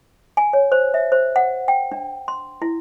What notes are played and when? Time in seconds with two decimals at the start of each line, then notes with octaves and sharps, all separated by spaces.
0.37 G#5
0.53 C#5
0.72 C5
0.94 E5
1.12 C5
1.36 F#5
1.68 G5
1.92 D4
2.28 C6
2.62 E4